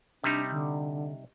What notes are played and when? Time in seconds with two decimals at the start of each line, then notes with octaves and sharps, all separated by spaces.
0.24 C3 G3 D4 D#4
0.51 D3